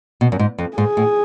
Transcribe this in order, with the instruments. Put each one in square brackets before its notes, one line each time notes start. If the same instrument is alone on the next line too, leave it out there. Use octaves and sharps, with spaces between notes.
[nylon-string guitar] B2
F#2
G#2
F2
[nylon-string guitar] G#2 [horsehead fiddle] G#4
[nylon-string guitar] A2